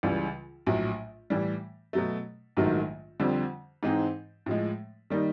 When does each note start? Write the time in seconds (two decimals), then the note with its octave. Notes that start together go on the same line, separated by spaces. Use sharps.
0.03 C#2 C#3 E3 G3
0.67 A#1 A2 F#3
1.30 A2 E3 G3
1.93 B2 F#3 A3
2.57 A#1 G#2 D#3 F#3 A3
3.20 F2 D3 G3 C4
3.83 G#2 E3 G#3 C4 D#4
4.46 A2 F3 G#3
5.10 D#3 G3 A#3 D#4